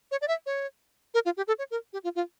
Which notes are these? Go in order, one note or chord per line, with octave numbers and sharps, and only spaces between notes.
C#5
D5
E5
C#5
A#4
F4
G4
A4
C#5
A#4
G4
F4
F4